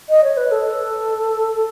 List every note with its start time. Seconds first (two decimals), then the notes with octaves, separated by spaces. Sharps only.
0.09 D#5
0.24 C#5
0.37 B4
0.51 A4